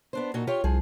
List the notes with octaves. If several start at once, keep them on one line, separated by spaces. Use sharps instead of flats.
B3 D4 C5
A#2 D#4 F#4
F4 G4 C#5
C2 F3 G#4